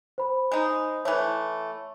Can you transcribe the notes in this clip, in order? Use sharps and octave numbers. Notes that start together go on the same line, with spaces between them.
C5 B5
G#3 D#4
E3 A3 C#5